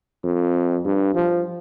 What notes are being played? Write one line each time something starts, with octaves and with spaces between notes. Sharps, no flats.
F2
G2
F3